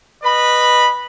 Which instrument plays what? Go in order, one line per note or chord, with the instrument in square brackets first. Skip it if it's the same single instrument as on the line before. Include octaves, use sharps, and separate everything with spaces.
[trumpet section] B4 D#5 B5